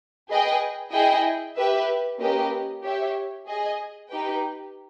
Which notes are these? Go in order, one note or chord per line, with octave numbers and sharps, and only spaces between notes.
G#4 B4 D#5 G5
E4 G#4 D#5 G5
G4 B4 E5
A#3 C#4 G4 B4 D#5
G4 C#5 E5
G#4 D#5 G#5
D#4 G4 B4 G5